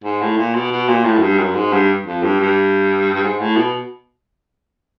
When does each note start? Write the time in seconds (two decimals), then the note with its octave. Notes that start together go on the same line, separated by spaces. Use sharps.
0.04 G#2
0.22 A2
0.38 A#2
0.55 B2
0.72 B2
0.89 A#2
1.05 A2
1.17 F#2
1.22 G2
1.39 F#2
1.55 G#2
1.73 G2
2.06 F2
2.23 G2
2.40 G2
3.14 G2
3.23 G#2
3.40 A2
3.56 B2